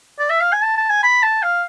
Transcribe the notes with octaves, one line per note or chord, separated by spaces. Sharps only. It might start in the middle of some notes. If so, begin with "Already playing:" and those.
D5
E5
F5
G#5
A5
A5
G#5
B5
A5
F5